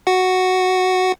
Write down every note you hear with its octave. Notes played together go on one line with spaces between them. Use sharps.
F#4 F#5